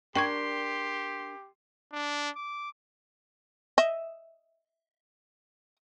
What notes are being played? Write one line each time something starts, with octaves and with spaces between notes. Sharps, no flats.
D4 G4 A#4 G5 C6 C#6 G#6
D4
D6
D#5 E5